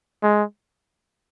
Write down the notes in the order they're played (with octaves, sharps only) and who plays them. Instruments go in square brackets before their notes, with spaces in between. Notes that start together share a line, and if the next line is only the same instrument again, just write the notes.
[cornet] G#3